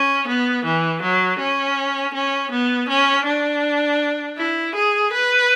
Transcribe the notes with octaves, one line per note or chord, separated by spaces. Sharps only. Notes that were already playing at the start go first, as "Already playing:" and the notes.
Already playing: C#4
B3
E3
F#3
C#4
C#4
B3
C#4
D4
E4
G#4
B4